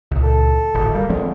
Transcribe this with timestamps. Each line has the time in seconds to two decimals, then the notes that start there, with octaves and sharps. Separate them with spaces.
0.11 C#2 A#2
0.23 A4
0.74 D1 G#1
0.94 G3 A#3
1.09 D3 F3 G#3 C4